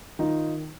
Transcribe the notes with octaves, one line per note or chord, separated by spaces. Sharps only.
D#3 D#4 F4